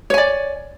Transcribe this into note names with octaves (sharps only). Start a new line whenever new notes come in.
C#5 D5 G#5